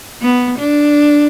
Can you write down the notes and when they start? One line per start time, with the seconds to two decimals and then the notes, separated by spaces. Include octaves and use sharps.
0.22 B3
0.59 D4